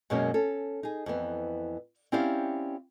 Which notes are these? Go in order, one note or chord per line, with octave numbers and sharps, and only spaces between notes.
F#2 B2 F#3 G#3 A#3 C#4
C#4 A4
D#4 G#4
F2 E3 B3
C4 C#4 E4 G4 D5 F5